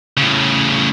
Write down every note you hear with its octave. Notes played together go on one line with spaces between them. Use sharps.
A2 C#3